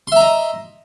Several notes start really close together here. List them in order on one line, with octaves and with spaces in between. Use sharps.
C6 E5 A#5 D#5